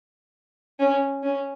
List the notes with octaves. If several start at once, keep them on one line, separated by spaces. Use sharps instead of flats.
C#4
C#4